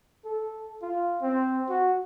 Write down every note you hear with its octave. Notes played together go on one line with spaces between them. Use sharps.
A4
F4
C4
F#4